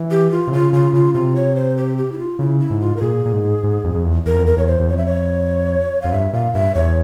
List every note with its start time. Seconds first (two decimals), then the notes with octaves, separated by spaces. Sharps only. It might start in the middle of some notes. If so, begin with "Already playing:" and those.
Already playing: E3
0.11 G4
0.31 F4
0.47 C3
0.52 C#3 F4
0.73 C#3 F4
0.93 C#3 F4
1.14 C3 F4
1.36 C#5
1.56 C5
1.77 G4
1.98 G4
2.12 E4
2.18 F4
2.39 C#3 E4
2.60 E4
2.70 G#2
2.81 F4
2.96 A#4
3.01 A#2 G#4
3.26 A#2
3.33 G#2
3.63 G#2
3.84 F2
3.95 F2
4.05 E2
4.26 E2 A#4
4.34 F2
4.43 E2 A#4
4.57 E2 C#5
4.67 C5
4.80 E2
4.89 F2 C#5
4.97 E5
5.06 C#5
6.02 F2 F5
6.12 G2 E5
6.33 A#2 F5
6.54 G2 E5
6.75 E2 C#5